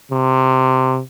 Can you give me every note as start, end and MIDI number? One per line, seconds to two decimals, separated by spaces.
0.11 1.01 48